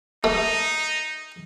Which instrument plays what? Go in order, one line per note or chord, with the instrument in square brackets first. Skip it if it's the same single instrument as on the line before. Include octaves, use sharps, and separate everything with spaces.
[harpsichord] A3 [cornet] D#4